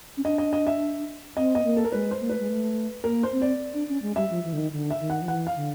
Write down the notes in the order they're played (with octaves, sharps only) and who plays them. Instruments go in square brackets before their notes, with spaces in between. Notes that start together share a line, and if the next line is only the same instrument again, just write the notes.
[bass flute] C#4
[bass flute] D4 [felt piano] D#5
[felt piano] D#5
D#5
E5
[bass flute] C4 [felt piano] D#5
[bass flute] B3 [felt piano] D#5
[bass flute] A#3
[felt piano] A4
A#4
[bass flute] G#3 [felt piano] B4
[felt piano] C5
[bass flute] A#3
[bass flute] A3 [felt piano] B4
[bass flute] G#3
A3
[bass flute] A#3 [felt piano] A#4
[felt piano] C5
[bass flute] C4
[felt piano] D5
[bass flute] D4
C#4
G#3
[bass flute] G3 [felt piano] E5
[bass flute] F3
E3
D3
D#3
D3
[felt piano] E5
[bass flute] D#3
[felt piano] F#5
[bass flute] F3
[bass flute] E3 [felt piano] F#5
[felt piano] F5
[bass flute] D3